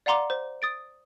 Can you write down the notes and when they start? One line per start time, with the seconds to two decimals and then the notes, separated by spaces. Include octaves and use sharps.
0.06 D5 F5 F#5 A#5 C6 D6
0.30 C5
0.62 D#6 A6 D7